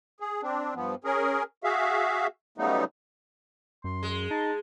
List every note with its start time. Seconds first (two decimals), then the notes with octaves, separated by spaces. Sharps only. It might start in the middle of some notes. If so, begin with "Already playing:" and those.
0.20 G#4
0.42 C4 D4
0.75 G2 F3 B3
1.04 C#4 G#4 A#4
1.64 F#4 G#4 E5 F5
2.58 C#3 F#3 G3 A3 B3 D#4
3.84 F#2 C6
4.03 G#3
4.31 D#4 A5